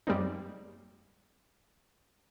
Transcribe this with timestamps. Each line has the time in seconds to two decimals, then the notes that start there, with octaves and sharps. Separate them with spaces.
0.07 F#2 G3 G#3 A#3 C4 D#4